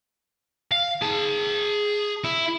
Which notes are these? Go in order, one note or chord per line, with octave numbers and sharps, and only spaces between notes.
F5
G#4 A5
E4